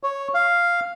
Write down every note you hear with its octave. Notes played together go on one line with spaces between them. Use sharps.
C#5
F5